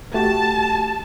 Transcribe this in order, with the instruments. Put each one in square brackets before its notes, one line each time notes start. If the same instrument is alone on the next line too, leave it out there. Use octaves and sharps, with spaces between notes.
[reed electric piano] A3 F#4 G4 [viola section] A5